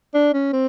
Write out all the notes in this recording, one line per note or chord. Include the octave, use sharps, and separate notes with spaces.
D4
C#4
C4